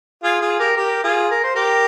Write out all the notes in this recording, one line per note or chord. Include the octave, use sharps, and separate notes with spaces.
F4 G#4
F4 G#4
G4 A#4
G4 A#4
F4 G#4
A#4
C5
G4 A#4